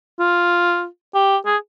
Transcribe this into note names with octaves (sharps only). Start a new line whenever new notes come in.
F4
G4
G#4